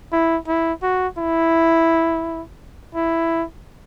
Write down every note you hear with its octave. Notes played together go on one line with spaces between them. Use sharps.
E4
E4
F#4
E4
E4